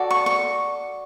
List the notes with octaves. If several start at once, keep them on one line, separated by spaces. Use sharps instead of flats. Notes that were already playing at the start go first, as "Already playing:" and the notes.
Already playing: F#4 A4 D5
C#6
C#6